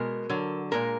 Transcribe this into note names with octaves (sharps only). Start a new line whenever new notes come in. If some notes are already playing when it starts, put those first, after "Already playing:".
Already playing: B2 G#3 A#4
D3 F#3
A#2 F3 G#3 A#4